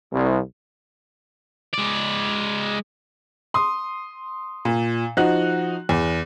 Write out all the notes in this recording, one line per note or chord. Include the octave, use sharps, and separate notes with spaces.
C2
G#3 D5
C6 D#6
A#2
F3 D#4 F#4 F#5 F#6
E2